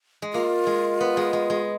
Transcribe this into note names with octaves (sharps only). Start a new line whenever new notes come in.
G#3
A#3 F4
G#3
B3
G#3
G#3
G#3